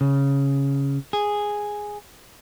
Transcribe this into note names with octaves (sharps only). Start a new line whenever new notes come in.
C#3
G#4